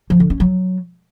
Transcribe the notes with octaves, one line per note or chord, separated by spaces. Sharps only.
F3
D3
C#4
F#3